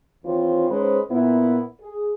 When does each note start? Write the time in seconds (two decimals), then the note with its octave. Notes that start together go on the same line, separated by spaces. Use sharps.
0.24 D#2 E3 C4 F4 C5 C#5
0.69 G#2 G#3 C#4 B4 C5
1.11 A#2 B3 E4
1.81 G#4